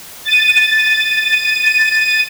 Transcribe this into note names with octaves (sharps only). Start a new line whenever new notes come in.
A6 D#7